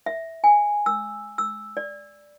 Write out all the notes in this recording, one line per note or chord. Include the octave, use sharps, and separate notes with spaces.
E5
G#5
E6
E6
D5